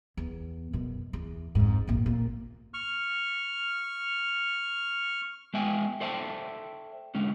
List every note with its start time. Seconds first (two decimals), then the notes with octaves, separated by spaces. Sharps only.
0.17 E2
0.73 F#2 B2
1.13 E2
1.55 F2 G#2
1.88 A#1 F#2
2.06 A#2
2.74 C#6 F6
5.54 G#3 B3 E5 G5 G#5
6.00 A4 C5 D5 E5 G5 A5
7.15 D3 G#3 C#4